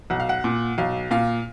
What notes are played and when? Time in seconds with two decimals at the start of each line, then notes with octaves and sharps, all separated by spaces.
0.10 B1 F#5
0.20 F5
0.29 F#5
0.44 A#2
0.78 B1 F5
1.11 A#2 F5